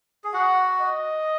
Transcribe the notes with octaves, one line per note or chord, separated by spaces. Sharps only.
G#4
F#4 F#5
D#5